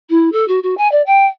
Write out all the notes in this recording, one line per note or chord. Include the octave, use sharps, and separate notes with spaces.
E4
A4
F#4
F#4
G#5
D5
G5